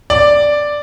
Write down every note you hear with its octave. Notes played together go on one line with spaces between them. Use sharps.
D5